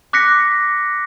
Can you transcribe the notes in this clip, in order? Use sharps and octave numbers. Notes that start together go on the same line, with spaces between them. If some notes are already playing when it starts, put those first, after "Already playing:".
D6 F#6 A#6 B6 C#7